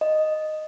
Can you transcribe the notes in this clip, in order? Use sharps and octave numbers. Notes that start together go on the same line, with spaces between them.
D#5